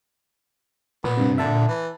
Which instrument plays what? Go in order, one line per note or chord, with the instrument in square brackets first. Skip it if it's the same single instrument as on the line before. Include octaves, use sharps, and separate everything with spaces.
[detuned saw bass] A#2 [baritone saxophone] B3
[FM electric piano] G2 C3
[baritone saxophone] D3 [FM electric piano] E5 A5
[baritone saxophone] E3